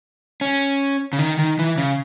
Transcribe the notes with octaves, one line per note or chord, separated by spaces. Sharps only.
C#4
C#3
D#3
D#3
E3
C#3